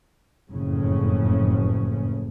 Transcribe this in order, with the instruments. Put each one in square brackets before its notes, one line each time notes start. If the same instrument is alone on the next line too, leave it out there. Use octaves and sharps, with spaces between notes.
[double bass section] F#1 F2 A2 C#3 C#4